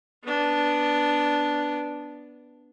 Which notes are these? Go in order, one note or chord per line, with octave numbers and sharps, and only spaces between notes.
B3 D4